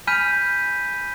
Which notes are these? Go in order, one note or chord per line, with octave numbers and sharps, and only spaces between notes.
G#5 B5 F6 G6 B6 D#7